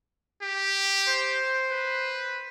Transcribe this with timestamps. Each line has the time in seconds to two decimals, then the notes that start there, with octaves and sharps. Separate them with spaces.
0.42 G4
1.08 C5
1.70 B4